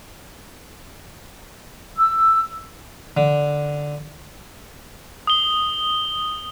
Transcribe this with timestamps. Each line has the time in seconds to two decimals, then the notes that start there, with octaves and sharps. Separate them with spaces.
1.98 E6
3.17 D3
5.27 D#6 G7